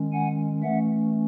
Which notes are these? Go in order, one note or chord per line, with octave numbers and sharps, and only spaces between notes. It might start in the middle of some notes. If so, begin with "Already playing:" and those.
Already playing: D#3 G#3 C#4
F#5 G#5
E3 A3 C#4 E5 F#5